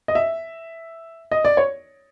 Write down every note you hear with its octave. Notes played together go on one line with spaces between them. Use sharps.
D#5
E5
D#5
D5
C#5